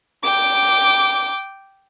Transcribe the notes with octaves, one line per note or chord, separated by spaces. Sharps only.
G5 D6